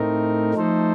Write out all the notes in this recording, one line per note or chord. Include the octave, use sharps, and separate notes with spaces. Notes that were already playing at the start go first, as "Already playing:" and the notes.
Already playing: A2 A3 C4 D#4 A#4
F3 A3 D#4 A4 C5